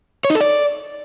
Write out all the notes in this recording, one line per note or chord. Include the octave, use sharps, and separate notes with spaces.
C#5
D#4
A4
D5